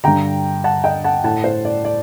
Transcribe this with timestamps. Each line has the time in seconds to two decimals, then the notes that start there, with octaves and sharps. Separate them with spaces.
0.04 G2 D3 G5 A#5
0.64 F#5 A5
0.84 D#5 G5
1.04 F#5 A5
1.24 A2 F#5 A5
1.44 C5
1.65 D5
1.85 D5